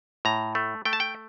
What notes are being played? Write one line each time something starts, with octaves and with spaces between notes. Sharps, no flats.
A2 A#5
A3
A3 G5
A5
G5